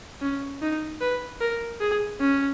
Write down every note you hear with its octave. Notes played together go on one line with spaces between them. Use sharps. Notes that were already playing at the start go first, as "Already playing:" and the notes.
C#4
D#4
B4
A#4
G#4
C#4